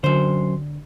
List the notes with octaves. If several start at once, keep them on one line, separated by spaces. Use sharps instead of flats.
F#2 D3 C5